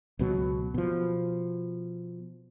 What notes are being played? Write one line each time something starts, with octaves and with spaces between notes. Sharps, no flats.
C#2 B2 F#3
B2 F3